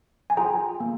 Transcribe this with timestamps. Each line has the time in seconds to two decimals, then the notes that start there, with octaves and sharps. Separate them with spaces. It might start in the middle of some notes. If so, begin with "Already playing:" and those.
0.30 G#5
0.37 F4 G#4 G5 A#5
0.80 A#3